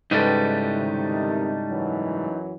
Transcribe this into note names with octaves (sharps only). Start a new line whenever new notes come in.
G#2 C#3 G3 D#4 E4 A4 B4 G5
C3 D#3
F#2 E3 F#3